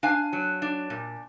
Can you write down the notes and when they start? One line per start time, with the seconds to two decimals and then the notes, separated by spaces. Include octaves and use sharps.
0.03 D4 F5 G#5
0.33 F#3
0.62 D4
0.90 A#2